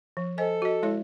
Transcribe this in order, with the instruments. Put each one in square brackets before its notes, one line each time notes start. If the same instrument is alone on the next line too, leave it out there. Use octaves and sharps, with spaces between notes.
[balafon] F3
[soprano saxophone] A4 [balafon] C5 D#5 G#5
[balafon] F#4 D#5
G#3 E4 C#5